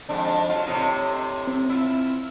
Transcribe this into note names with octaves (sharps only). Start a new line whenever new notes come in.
F2 G#2 D4
F#3 F4
A2 C3 D#4
C4
E4 F4